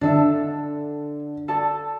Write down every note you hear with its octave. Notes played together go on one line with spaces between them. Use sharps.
D3 D4 A4 E5
A4 D5 A5